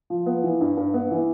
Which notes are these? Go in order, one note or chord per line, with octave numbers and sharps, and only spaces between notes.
F3
B3
E3
G2
G2
B3
E3